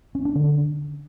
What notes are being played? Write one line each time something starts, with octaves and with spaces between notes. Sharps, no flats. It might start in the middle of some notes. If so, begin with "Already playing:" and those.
C#4
D4
D3